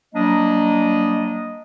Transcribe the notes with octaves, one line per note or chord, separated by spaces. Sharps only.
F#3 G3 A#3 D4 D#5